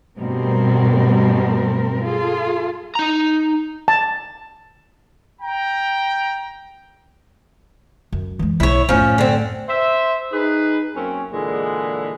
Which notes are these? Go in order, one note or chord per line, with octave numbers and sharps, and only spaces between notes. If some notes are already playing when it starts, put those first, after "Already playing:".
G2 B2 G3 A3 C4 A#4
F4 G#4 A4
D#4 A#5
A5
G5 A#5
F#2
E3 G#3
B1 E4 C#5
F#2 A2 F3 C#4
D3 C4
C5 E5
D#4 G#4 B4
F#2 A#3 C4 C#4
A#2 D3 E3 G#3